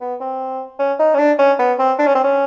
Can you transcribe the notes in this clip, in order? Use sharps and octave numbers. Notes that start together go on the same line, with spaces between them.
B3
C4
C#4
D#4
C#4
D4
C#4
B3
C4
D4
C#4
C4
C#4